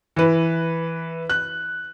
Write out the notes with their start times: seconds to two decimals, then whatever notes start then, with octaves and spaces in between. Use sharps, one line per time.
0.16 E3 B4
1.29 F#6